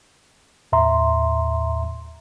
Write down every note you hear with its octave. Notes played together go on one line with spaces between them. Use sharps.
D#2 A2 E5 A#5 C6